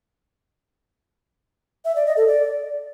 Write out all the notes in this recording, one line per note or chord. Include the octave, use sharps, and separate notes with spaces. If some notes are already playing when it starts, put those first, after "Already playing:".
E5
D5
D#5
A4
D5